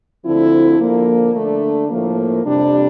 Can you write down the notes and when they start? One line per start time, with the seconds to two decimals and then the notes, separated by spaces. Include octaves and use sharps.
0.24 D2 D3 F3 C4 E4
0.79 D3 F3 A#3
1.34 D3 A3 D4
1.89 A2 F3 A#3
2.44 F2 C3 G3 D4